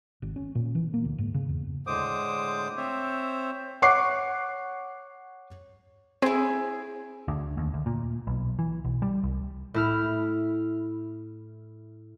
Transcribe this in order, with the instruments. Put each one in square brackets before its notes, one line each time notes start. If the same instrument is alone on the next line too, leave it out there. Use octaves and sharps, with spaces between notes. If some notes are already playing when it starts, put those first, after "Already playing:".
[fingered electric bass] G#1
C#4
A#2
E3
A#3
D2
G#2
C#3
E2
[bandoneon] A2 D3 G#3 C5 D6 D#6
C4 C5 C#5 E5
[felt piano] C#5 F#5 C#6 D6 F#6 C7
[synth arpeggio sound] C4 [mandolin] E4 G#4
[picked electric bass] D2
D#2
D2
A#2
B1
E3
B1
G3
C2
[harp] A2 E4 F6